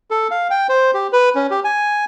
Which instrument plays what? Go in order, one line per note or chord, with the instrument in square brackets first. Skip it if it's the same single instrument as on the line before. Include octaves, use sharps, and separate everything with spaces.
[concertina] A4
F5
G5
C5
G4
B4
C#4
G4
G#5